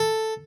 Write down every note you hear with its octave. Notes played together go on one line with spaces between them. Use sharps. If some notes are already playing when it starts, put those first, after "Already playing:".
Already playing: A4